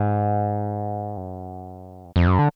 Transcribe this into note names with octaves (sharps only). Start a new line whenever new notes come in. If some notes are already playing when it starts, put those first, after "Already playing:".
Already playing: G#2
F#2
F2
F2
F#2
D3